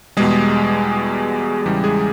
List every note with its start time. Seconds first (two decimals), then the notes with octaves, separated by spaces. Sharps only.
0.17 E2 B2 G3 G#3 G#4
1.66 E2 C#3 E3 G3 G4
1.84 G#3 G#4